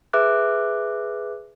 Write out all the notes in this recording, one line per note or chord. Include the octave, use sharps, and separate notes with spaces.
G#4 B4 E5 D6 F#6